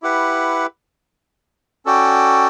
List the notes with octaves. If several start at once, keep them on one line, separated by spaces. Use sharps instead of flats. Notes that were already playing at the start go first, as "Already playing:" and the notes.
E4 G4 B4 F#5
C#4 F#4 A4 D5 G5